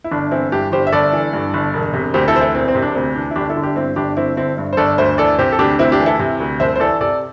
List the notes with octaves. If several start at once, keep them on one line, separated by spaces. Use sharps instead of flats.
E4
G1 D4
E3 C4 E4
G2 D4 G4
G1 G4 C5
E5
G1 A4 D5
E3
G2
G1
E1
C3
D2 G4 C5
E4 A4
E3 C5
E4 A4
E1 C4
C4
C3
D4
D2 C4
E3 D4
E4
G1 D4 G4
E4 A4
D3
D4 G4
G2 C4 E4
G1 D4 G4
G1 C4 E4
D3 C4 E4
G2
C5
G1 A4 D5
D2 C5 E5
E3 A4 D5
C3 G4 C5
A4
D2 D4 G4
D2 C4 E4
D4 G4
E3
E4 A4
C3
D2
C2 C5 E5
C5
E3 A4 D5
C3 A4 D5